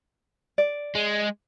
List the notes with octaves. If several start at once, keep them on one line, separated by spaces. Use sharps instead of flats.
D5
G#3